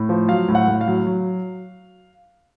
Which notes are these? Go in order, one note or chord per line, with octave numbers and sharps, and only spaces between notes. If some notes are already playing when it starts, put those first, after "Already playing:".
Already playing: A2
F3
F#3 F5
A2
F#5
A2
F5
F#3
F#3